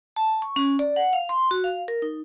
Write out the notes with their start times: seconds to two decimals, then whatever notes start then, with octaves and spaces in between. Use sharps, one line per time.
0.16 A5
0.42 C#6
0.56 C#4
0.79 D5
0.96 F#5
1.13 F5
1.29 C6
1.51 F#4
1.64 F5
1.88 A#4
2.02 D#4